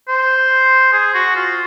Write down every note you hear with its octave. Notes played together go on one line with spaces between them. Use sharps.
C5
G#4
F#4
F4